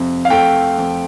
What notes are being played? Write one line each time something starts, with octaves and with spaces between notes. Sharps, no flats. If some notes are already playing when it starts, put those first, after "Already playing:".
Already playing: F2 C3
F5
A3 G5
F2